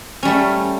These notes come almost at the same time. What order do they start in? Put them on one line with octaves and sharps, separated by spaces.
C#4 G3 A3